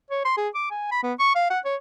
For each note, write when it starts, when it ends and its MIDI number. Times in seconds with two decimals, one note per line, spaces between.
0.10 0.24 73
0.25 0.35 84
0.37 0.48 68
0.55 0.70 86
0.71 0.88 80
0.91 1.03 83
1.03 1.13 59
1.20 1.33 85
1.35 1.46 77
1.50 1.59 78
1.65 1.76 73